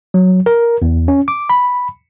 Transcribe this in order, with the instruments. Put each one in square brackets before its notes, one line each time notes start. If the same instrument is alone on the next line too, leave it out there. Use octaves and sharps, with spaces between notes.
[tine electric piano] F#3
A#4
E2
C#4
D6
B5